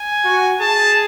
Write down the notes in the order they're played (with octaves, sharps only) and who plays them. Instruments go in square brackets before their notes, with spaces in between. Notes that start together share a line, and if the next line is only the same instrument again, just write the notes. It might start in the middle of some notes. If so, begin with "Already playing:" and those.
Already playing: [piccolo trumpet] G#5
[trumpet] F#4
[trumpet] G#4 [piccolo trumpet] A5